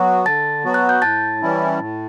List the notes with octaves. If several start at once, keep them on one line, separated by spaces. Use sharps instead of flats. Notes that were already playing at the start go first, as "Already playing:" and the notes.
Already playing: F#3 B3 F#4
D3 A5 A6
F#3 B3 F#4
F#6
G6
A2 A5 A6
E3 G3 C#4 E4
A2